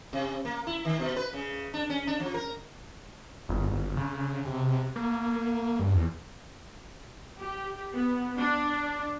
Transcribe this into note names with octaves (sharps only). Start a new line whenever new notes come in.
C3
A#3
E4
D#3
B2
B4
C#3
D4
C#4
D4
F3
A#4
G1
G1
C#3
C3
A#3
G2
E2
G4
B3
D4